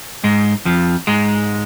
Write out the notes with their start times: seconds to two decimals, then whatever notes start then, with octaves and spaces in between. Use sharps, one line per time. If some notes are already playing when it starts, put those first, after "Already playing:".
0.24 G#2 G#3
0.65 F2 F3
1.07 G#2 G#3